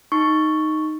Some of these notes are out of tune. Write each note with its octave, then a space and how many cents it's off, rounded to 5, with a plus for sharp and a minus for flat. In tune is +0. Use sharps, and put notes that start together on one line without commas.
D#4 +0 C#6 +0